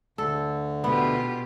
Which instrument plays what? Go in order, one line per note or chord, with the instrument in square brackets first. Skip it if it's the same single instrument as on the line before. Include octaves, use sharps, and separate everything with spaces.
[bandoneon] D2 D3 [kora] A4
[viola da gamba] B2 F4 G4 [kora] B3